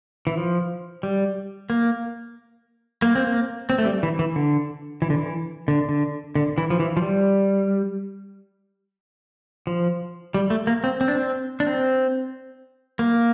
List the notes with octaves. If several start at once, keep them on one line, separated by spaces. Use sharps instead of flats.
E3
F3
G3
A#3
A#3
C4
A#3
C4
A3
G3
E3
E3
D3
E3
D3
E3
D3
D3
D3
E3
F3
E3
F3
G3
F3
G3
A3
A#3
C4
C4
D4
C4
D4
C4
A#3